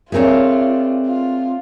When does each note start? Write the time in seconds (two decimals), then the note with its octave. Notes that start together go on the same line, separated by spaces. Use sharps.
0.12 A3 C4 D4 F4 G#4 A#4 C#5
1.06 F4